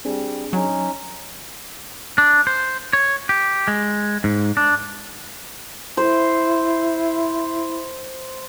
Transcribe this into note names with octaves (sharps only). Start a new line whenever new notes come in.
G3 C4 D4 G#4
F#3 C#4 D#4
D4
C5
C#5
G4
G#3
G#2
D4
E4 C5